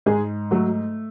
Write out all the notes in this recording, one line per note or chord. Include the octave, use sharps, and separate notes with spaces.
G#2 G#3 G#4
F#3 A3 F#4